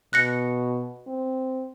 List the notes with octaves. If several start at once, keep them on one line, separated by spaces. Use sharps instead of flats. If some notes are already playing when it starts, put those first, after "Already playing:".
B2 F#6 A#6 C#7
C4